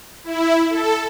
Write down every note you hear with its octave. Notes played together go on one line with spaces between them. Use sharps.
E4
A4